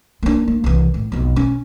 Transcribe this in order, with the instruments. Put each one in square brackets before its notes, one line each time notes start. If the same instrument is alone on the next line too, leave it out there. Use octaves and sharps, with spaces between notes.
[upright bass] A#3 D4
A#3
C2 E3
A2
B1 F2
C#4